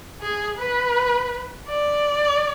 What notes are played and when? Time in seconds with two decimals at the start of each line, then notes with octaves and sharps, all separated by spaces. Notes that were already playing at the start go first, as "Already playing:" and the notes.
0.22 G#4
0.59 B4
1.69 D5